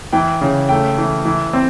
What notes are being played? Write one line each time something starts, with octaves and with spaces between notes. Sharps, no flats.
E3 G5
C#3
A3 G5
E3
E3
C4